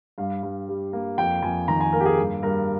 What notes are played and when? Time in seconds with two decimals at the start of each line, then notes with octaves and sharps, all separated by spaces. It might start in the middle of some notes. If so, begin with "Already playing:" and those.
0.18 G2 F5
0.43 G2
0.68 G3
0.93 A#3
1.18 F2 G5
1.42 F2 G#5
1.68 D#3 A#5
1.80 G#5
1.93 A#3 A#4
2.00 G4
2.06 G#4
2.18 G2
2.43 G2 A#4